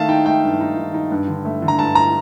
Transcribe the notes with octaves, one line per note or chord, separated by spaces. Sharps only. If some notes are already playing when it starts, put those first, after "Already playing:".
Already playing: D#3 A3 F5 A5
D#4 G5
A3 G5
G2
D#4
D#3
D#4
G2
D3
A3
D3
A#5
G2 A5
A#5